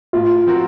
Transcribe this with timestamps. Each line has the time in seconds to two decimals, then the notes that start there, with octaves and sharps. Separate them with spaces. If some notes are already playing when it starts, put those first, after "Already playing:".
0.13 A2 F4
0.46 F3 C4 F#4 A#4